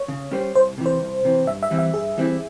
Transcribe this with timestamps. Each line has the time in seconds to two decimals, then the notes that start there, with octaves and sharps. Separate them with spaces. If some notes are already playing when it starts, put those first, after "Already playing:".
Already playing: C#5
0.08 C#3
0.31 G3 C#4 G4 C5
0.55 C2 C5
0.78 C3 E3
0.86 C5
1.02 C2
1.25 C3 E3
1.47 G2 E5
1.63 E5
1.71 E3 G3 C4 E4
1.79 E5
1.94 G2 G#4
2.17 E3 G3 C4 E4